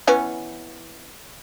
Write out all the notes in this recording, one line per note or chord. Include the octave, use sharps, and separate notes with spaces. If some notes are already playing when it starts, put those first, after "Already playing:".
E3 B3 C#4